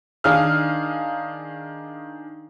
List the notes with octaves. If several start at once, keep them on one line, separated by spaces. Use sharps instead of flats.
D#3 D4 G#4 F5 D#6 F6